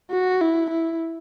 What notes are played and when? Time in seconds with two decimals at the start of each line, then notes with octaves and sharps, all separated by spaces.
0.11 F#4
0.41 E4
0.71 E4